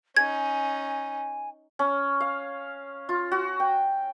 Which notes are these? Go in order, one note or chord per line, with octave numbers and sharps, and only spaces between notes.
C#4 D#4 G#5 G#6
C#4
F5
F4
F#4
G5